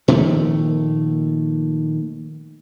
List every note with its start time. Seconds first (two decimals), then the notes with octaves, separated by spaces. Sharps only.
0.08 A#2 D#3 F3 A3